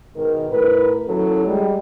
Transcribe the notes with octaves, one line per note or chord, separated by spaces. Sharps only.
G#2 B2 D#3 A#4
A2 A#4 B4
D#2 F#3 C#4 E4 A4
G3 G#3